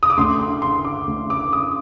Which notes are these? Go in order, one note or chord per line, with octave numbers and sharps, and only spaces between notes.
D#6
D6
D2 D3 A3 C6
C6
C6
D6
D2 D3 A3
D6
D#6